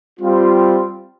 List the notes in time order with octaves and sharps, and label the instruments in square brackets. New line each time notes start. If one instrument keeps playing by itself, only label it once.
[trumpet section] G3 C4 F4